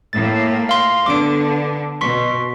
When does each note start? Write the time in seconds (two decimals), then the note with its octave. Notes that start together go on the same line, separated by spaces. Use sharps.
0.13 A2 A3 A#3 A6
0.69 F5 C6 A#6
1.06 D3 B3 D4 D6 D7
2.01 B2 C6 C#6 B6